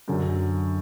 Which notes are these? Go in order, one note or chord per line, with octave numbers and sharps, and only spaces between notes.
F#2 D3 F#3